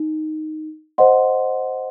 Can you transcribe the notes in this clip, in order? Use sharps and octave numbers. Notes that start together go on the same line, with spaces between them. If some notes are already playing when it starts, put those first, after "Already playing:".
Already playing: D#4
C5 D#5 F#5 C6